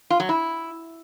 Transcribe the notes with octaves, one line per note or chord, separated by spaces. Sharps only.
F4
F#3
E4